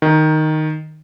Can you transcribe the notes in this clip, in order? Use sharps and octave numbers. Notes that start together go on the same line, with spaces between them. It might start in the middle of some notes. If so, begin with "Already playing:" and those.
D#3